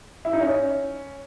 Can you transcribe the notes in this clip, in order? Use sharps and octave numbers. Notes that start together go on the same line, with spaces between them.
E4
D#4
C#4